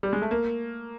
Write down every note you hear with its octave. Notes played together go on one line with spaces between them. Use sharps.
G3
G#3
A3
A#3